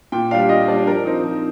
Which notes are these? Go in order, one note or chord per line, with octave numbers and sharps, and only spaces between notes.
A#2 G5
G3 D4 F5
A#2 D#5
G3 D4 D5
F3 A#4
C4 D#4
F3